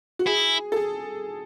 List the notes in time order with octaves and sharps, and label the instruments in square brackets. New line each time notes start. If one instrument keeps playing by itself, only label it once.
[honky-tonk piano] F#4
[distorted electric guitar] E4 [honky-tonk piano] G#4
[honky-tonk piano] A4
G#4